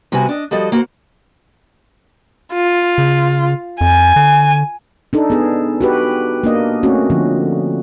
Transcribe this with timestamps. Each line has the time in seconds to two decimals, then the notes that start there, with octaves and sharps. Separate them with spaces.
0.12 C3 G3 B3 F#4 G#5
0.29 D4 D#5
0.51 F3 G3 F#4 A4 D#5
0.72 A#3 F#4 B4 C5
2.53 F4
2.98 C#3
3.81 F2 G#5
4.16 D3
5.13 D4 D#4 A4
5.30 B3 G#4
5.81 F#4 G4 B4
6.44 A#3 D4 D#5
6.83 A3 C4 C#4 F#4
7.10 D3 F3